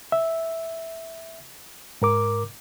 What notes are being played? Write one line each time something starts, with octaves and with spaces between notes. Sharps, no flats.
E5
G#2 A#4 D6